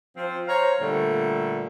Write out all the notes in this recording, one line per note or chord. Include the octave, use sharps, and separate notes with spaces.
F3 C4
C5 C#5 F5 A#5
A#2 D3 G3 A3